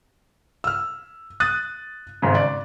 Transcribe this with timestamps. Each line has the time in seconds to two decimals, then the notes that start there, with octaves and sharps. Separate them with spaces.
0.64 E6 F6
1.40 D#6 F#6 A6 D#7
2.22 G#1 G#2 C#3
2.35 D5